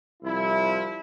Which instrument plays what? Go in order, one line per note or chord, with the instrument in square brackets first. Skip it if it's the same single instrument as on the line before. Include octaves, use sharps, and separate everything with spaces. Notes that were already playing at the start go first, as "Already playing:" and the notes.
[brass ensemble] C2 F3 E4